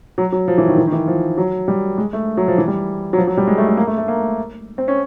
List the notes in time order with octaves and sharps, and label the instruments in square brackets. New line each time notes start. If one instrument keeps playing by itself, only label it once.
[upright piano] F#3
F#3
F3
E3
D#3
E3
D#3
E3
F3
F#3
G3
G#3
A3
F#3
F3
E3
G3
F#3
F3
F#3
G3
G#3
A3
A3
A#3
A3
A3
A#3
C4
C#4